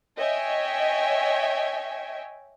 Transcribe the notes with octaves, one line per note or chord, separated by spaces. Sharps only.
C#5 D#5 E5 G5 G#5